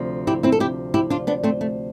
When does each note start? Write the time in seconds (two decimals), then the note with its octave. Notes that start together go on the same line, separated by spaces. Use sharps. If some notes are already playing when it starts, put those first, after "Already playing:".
Already playing: D2 C3 F3
0.27 E4 G4
0.43 C4 E4
0.52 A4
0.60 E4 G4
0.94 E4 G4
1.10 D4 F4
1.27 B3 D4
1.43 A3 C4
1.61 A3